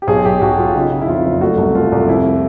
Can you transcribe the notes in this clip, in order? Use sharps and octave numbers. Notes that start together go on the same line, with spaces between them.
G4
B1 G#4
B1 G4
B1 F#4
B1 F4
C#3 D#4
C#3
E4
F2 F4
F#1
A3 F#4
C2
A3 F4
C2
F2 E4